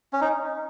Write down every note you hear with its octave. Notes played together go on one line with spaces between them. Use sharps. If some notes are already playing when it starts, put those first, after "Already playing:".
C#4
D#4